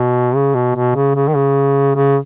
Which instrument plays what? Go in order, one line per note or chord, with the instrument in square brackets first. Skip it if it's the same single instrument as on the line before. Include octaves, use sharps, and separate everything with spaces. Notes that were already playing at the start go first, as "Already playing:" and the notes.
Already playing: [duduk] B2
C#3
B2
B2
C#3
C#3
D#3
C#3
C#3